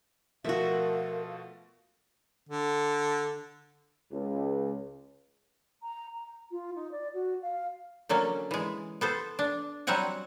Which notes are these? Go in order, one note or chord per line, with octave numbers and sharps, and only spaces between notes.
B2 F3 A3 F#4 A#4 E5 F5
D3
C#2
A#5
A#5
F4
D#4
D5
F#4
F5
D3 F#3 A#3 C#4
E3 G#3
B3 A4 C5
D4
F#3 G3 C4 E5 F#5 G#5